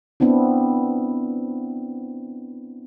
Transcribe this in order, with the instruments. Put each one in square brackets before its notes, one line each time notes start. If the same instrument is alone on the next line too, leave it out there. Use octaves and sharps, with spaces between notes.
[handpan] B3 C4 D4 E4